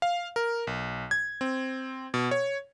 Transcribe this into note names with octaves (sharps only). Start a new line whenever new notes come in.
F5
A#4
B1
G#6
C4
B2
C#5